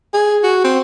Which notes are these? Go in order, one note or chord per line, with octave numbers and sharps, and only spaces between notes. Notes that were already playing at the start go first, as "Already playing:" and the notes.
G#4
F#4
C4